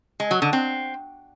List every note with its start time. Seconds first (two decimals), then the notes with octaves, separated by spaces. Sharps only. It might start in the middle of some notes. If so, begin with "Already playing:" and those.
0.20 G#3
0.31 F#3
0.42 D3
0.53 C4